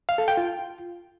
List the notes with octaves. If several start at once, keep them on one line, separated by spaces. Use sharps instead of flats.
F5
A4
G5
F4